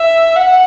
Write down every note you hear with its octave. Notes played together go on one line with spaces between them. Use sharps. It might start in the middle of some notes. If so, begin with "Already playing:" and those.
Already playing: E5
F#5